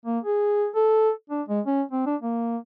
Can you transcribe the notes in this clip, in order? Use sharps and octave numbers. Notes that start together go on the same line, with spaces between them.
A#3
G#4
A4
D4
G#3
C#4
C4
D4
A#3